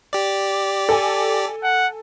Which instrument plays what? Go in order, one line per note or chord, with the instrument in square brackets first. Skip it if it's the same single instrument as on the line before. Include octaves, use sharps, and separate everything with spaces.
[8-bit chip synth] G4 D5
[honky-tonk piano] A4 G#5
[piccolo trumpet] F#5